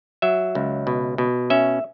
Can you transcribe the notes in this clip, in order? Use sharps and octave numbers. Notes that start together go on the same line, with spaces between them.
F#3 E5
C#2
B2
B2
C#4 E5